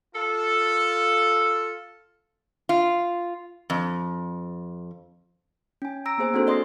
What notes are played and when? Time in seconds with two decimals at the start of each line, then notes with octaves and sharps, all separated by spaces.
0.15 F4 A4
2.69 F4
3.70 F2
5.82 C#4 G#5
6.06 A#5 E6 A#6 D7
6.18 A#3 B3 G#4 C5 G#5
6.34 C4 D4 F#4 A4 C5
6.47 D5 D#5 C6 D#6 A#6 C7